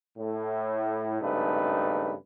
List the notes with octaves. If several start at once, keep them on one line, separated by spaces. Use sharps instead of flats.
A2
G#1 G2 C#3 A3 D#4 B4